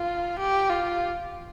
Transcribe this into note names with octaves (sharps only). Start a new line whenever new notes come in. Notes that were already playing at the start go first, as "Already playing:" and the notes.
Already playing: F4
G4
F4